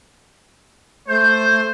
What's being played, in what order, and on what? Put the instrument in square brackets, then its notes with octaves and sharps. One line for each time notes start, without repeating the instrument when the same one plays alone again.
[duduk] A3 [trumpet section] C5 [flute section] G6